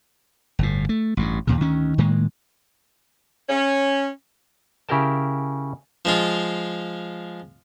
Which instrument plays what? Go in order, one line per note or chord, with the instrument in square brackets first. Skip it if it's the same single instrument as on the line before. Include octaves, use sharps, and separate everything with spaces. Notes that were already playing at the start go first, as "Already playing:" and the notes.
[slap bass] G1 A2
A3
A1 G2
D#2 A#2 C#3
D2 D#3 C#4
A2 D#3 G#3 A#3
[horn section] C#4
[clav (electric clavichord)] C#3 E4 G4 A#4 G5 A5
[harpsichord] F3 G#3 F4